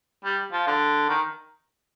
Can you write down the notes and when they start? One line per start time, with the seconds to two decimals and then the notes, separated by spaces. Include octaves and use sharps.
0.25 G3
0.52 F3
0.67 D3
1.09 D#3